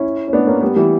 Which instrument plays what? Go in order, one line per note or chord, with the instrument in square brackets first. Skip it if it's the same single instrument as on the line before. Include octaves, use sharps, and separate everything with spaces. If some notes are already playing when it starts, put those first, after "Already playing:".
Already playing: [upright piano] C#4 E4
C#4
B3 D4
A#3 C#4
G3 B3
E3 G3